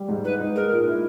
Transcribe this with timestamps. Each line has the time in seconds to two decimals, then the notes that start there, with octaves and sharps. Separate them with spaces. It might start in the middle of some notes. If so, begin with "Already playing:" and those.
Already playing: G3
0.08 G#2
0.24 D#4 B4
0.39 D#4
0.56 G#3 A#4
0.72 A#2
0.88 E4